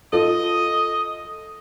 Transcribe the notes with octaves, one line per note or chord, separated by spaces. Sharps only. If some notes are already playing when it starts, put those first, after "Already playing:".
F4 A4 D#5